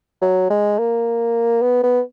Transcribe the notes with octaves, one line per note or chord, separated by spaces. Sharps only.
F#3
G#3
A#3
B3
B3